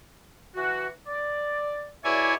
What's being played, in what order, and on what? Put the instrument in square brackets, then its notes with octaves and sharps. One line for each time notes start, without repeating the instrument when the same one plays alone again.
[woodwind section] E3 F#4
D5
[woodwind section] E2 B2 D5 [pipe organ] E4 C#5 G#5